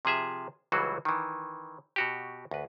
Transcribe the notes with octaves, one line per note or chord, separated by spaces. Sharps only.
C3 F3 G#4 E5
C#2 E3 F#3 G3 F#4 C5
D#3 E3
B2 F#4 G4
D2 B4